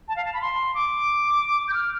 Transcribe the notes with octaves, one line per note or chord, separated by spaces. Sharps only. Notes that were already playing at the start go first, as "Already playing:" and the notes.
A5
F5
A5
B5
C6
D6
G6
F6